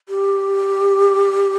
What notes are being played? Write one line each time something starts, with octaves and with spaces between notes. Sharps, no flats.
G4